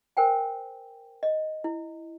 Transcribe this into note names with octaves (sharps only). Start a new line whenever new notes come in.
A#4 C5 G5 G#5
D#5
E4